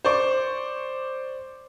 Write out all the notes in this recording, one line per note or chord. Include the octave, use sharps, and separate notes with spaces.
C5 D5 C#6 D6